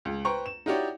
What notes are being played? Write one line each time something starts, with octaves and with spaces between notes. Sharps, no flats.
C#2
B4 C5 G5 A#5 C#6
E7
D#4 E4 F#4 G4 C#5 D5